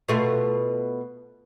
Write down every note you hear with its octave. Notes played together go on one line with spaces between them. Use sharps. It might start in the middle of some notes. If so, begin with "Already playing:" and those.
B2 A3 F4